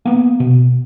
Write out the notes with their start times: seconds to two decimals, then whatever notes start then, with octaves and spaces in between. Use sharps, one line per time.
0.05 A#3 B3
0.40 B2